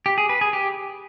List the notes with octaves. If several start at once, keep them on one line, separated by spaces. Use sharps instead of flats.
G4
G#4
B4
G#4
G4